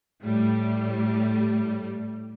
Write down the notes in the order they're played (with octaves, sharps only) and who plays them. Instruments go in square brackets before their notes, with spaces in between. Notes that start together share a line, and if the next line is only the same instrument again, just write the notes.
[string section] A2 G3